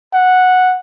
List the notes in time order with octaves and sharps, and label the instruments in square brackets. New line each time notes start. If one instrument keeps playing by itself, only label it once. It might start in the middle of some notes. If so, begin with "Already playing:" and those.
[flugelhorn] F#5